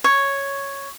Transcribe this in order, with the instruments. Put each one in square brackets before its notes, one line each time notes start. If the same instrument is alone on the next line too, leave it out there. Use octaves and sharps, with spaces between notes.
[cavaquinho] C#5